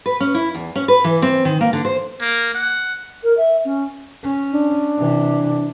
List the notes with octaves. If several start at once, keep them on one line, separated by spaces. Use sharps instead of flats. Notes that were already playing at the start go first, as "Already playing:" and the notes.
B4
C#4
E4
E2
C#4
B4
E3
C4
D#3
A#3
D3
C5
A#3
F#5
A#4
E5
C#4
C#4
D4
C3 E3